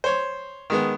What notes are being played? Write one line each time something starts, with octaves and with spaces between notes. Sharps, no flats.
C5 C#5 C6
D#3 G#3 B3